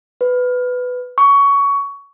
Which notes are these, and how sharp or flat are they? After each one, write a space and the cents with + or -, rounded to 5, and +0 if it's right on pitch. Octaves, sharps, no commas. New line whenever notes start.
B4 +10
C#6 +20